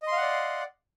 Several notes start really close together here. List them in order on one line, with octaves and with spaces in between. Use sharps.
D#5 C6 F5 F#5 D5